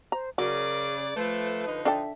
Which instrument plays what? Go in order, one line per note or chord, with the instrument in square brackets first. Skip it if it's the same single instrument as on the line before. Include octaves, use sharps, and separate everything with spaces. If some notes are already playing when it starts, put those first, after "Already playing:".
[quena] C5 [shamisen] A#5
[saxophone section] C#3 D5 [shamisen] F#3 [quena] A#4
[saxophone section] F3 A3 [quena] B4
[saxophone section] D3 F3 D#4
[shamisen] D4 A4 G5 [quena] E5